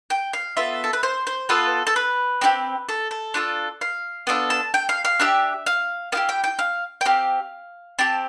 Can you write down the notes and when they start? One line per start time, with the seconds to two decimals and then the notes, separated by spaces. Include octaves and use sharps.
0.10 G5
0.33 F5
0.57 B3 F4 A4 E5
0.84 A4
0.93 B4
1.03 C5
1.27 C5
1.49 B3 F4 A4 B4
1.87 A4
1.96 B4
2.41 C4 E4 G4
2.89 A4
3.11 A4
3.34 D4 F4 A4
3.81 F5
4.27 B3 D4 F4 A4
4.50 A5
4.74 G5
4.89 F5
5.05 F5
5.19 D4 G4 E5
5.66 F5
6.12 B3 E4 G4 F5
6.29 G5
6.44 G5
6.59 F5
7.01 G5
7.05 C4 G4 F5
7.99 C4 G4 A5